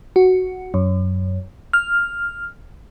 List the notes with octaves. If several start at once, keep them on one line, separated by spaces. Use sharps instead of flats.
F#4
F#2
F6